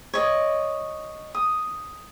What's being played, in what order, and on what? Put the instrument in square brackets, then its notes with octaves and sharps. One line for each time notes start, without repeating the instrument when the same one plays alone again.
[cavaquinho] C#5 D#5
D#6